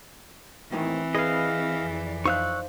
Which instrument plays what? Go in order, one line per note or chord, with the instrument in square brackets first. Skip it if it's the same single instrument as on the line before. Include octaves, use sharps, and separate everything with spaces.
[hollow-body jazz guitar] D#2 A2 D#3 [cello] E3 [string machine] C4
[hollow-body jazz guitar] G#4 B4 [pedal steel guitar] D#5 F5
[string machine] F2 D5
[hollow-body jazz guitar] D#4 C5 F5 [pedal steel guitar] C#6 E6 F#6